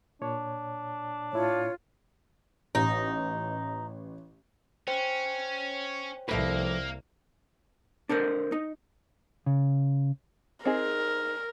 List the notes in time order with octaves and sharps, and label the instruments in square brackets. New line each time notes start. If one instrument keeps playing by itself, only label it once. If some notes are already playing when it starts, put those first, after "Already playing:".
[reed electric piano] A#2 C#5 [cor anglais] D4
[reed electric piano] A2 E4 A5 [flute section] F4 C#5
[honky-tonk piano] A1 [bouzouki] D#4
[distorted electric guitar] C#4 [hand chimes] C5 C#5 G5
[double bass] C2 [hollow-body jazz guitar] F3 A3 B4 [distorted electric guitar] A#3
[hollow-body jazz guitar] D4 A4 A#4 C5
D#4
[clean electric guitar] C#3
[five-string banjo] C4 D#4 G#4 [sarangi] A#4